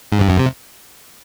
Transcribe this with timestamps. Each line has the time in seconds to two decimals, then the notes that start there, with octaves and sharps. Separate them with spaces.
0.12 G#2
0.21 G2
0.30 F#2
0.39 C3